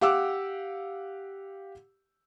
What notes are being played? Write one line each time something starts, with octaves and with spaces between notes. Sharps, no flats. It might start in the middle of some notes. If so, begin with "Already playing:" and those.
G4 F5 F#5 D6 E6